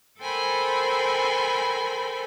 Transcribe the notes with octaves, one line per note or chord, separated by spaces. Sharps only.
A4 A#4 C5 G5 G#5 B5